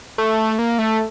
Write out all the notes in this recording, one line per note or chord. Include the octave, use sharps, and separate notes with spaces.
A3
A#3
A3